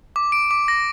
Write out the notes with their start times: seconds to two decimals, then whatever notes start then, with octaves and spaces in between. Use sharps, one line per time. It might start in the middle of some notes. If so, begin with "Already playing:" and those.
0.16 D6
0.32 D7
0.51 D6
0.68 A#6